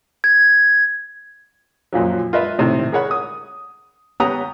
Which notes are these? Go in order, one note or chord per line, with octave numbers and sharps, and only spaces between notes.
G#6
F#2 A#2 F3 F#3
F4 A#4 B4 D#5 E5 B5
A2 C3 D#3
G#4 A#4 C#5 F#5 B5
D#6
B3 C#4 G4 F#5 A#5 D#6